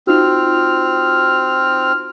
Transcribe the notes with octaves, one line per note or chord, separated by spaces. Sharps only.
C4 D#4 F4 F#4 F6